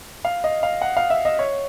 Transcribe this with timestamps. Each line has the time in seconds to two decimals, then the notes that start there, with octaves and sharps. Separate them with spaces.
0.25 F5
0.44 D#5
0.63 F5
0.82 F#5
0.97 F5
1.10 E5
1.25 D#5
1.39 C#5